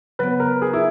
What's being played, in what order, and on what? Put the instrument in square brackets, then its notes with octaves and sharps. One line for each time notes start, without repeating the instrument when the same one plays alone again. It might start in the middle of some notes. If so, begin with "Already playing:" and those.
[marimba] C#3 F#3 B3 [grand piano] B4
[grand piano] A#4
G#4
E4